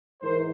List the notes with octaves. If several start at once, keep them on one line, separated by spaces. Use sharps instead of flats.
G#2 E3 A#4 C5